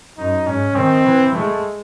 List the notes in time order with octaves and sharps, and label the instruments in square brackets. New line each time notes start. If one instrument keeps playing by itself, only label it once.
[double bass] F#2 [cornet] D#4
[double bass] G#2 [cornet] C#4
[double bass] D#3 [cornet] C4
[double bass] E3
[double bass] G#3 [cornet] A3